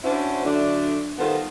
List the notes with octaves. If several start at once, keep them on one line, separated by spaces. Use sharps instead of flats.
C#4 D4 E4 F#4 C5
D3 F#3 A3 D4
D#3 G3 B3 F4 A4 C5